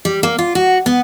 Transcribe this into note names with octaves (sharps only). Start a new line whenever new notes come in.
G3
A#3
F4
F#4
B3